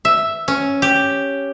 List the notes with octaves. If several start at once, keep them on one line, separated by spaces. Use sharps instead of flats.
E5
C#4
G4